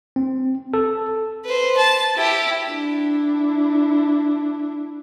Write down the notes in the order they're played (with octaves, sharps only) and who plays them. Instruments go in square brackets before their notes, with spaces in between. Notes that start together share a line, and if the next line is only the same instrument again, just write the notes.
[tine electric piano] C4
A4
[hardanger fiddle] B4 C5
A5
E4 G4
[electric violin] D4 E4